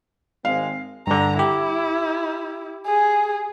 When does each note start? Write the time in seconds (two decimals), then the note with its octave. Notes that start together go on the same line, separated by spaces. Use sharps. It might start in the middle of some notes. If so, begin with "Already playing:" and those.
0.45 G#1 G#3 C4 F5
1.07 G2 D3 A#5
1.39 E4 G4
2.86 G#4